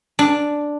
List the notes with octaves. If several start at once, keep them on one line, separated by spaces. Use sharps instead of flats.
D4